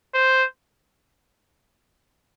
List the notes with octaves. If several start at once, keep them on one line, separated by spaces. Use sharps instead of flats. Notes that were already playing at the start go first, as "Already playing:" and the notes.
C5